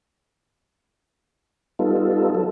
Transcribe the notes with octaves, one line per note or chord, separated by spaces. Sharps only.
G3 B3 D#4 F4 A4
F#3 A4